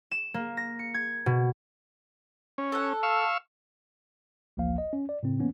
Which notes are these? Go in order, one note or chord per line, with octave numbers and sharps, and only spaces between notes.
E7
A#3
A#6
C#7
G#6
B2
C#4
A4 F#5
F5 C#6 E6
A1 D2 F3 A#3 F5
D#5
C#4
D5
A2 C#3 C4
E3 A#3 B3 C#4